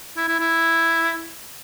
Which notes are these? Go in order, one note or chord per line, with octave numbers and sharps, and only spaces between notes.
E4
E4
E4